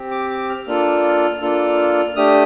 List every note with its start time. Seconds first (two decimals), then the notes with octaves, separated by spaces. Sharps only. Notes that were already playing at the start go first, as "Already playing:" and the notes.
Already playing: C4 G4
0.11 D6
0.30 D6
0.49 F6
0.67 A#3 D4 F4 A4 F6
1.42 A#3 D4 F4 A4
2.16 A3 D4 G4 D#6